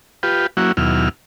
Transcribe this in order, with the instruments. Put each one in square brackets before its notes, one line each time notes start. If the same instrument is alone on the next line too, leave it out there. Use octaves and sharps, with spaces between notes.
[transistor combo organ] F4 G4 B4
F#3 A#3 C#4 E4 F#4
D#2 B2 F#3 E4 F6